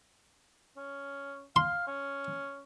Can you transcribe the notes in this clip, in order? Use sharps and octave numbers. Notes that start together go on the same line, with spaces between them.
C#4
F5 C6
C#4